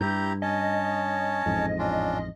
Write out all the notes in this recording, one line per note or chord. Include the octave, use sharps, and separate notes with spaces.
G2 E4 G4 A#5 G6
C#4 C#5 D#5 A5
A1 F2 G#2
C#4 D4 F4